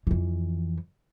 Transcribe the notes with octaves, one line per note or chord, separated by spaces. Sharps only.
F2 E3